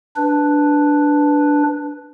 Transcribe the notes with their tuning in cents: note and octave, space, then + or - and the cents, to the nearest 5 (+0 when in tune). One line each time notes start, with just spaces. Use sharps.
D4 +0 B4 +0